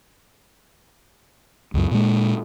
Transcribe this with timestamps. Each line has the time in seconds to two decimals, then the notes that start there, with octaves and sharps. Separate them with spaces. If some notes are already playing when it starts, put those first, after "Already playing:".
1.74 C#2 F#2
1.91 A#2 G#3